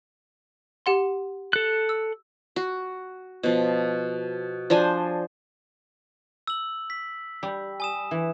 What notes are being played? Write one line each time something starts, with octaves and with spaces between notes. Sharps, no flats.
G4 F#5 C6
A4 F#6
E6
F#4
B2 F3
F3 D4 C5 G#5
E6 F#7
B6
G3
G#5 D#6 E7
E3